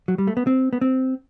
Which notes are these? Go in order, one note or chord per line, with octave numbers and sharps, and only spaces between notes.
F#3
G3
A3
B3
C4
B3
C4